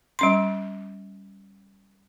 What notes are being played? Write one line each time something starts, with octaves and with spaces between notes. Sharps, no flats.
G3 C#4 C6